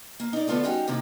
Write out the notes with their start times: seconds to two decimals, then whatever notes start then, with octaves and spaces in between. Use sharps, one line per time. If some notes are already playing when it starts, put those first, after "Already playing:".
0.20 A#3
0.33 D#4 D5
0.47 D3 A3 B3 F4 A4 D5
0.64 G3 C#4 D#4 F#4 G4
0.88 C3 D#3 A#3 C4 E4